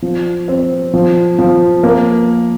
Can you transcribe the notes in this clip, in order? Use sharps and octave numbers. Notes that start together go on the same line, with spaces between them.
F3
C4
F3
F3
A#3